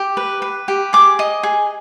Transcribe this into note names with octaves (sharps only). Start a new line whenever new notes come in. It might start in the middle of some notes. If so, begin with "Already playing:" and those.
Already playing: G4
B4
B4
G4
G#4 D6
D#5
G#4